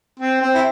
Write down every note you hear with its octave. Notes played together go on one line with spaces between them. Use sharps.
C4
C4
E4